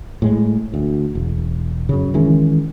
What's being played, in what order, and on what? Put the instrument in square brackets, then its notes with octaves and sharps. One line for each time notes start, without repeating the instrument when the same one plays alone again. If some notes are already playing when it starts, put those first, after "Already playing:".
[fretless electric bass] A2 G#3
D2
E1
F#2 C#3
D#3 E3 G#3 C#4